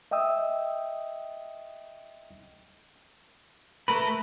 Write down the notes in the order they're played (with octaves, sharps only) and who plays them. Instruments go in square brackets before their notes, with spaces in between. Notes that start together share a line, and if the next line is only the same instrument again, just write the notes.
[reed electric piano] D#5 E5 G5 D#6 E6
[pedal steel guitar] A3 A#4 B4 [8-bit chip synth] B5